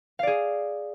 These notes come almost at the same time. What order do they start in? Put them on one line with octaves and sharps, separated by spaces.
F5 D5 G#4